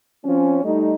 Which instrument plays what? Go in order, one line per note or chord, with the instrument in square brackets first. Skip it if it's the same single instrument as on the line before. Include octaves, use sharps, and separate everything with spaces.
[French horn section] F3 C4 C#4
G3 A3 D#4